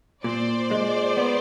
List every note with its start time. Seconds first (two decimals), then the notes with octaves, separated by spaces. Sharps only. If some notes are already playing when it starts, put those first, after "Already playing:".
0.24 A#2 C5 D5
0.71 G#3
1.17 B3